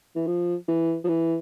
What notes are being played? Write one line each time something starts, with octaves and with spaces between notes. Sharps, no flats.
E3
F3
E3
F3
E3